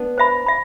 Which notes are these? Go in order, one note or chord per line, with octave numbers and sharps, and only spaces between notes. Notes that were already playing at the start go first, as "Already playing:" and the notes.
Already playing: B3 D4
C5 E5 B5
E5 B5